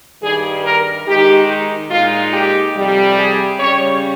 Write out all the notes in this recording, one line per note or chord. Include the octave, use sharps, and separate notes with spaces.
G2 D#3 G3 G#4
A#4
D#3 G#3 D#4 G4
A#2 G#3 D#4 F4
G4
F2 C3 G3
G#4
C#3 G3 C#4 C#5